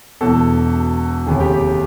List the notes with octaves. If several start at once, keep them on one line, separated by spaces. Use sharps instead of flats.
E1 E2 B2 A4
F1 D#2 C#3 G#4
G4
G4